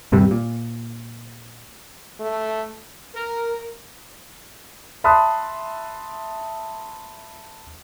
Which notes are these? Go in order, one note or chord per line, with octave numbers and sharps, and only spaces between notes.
D#1 G2 C3 G3
A#2
A3
A#4
E5 A5 B5 C6 D#6 F#6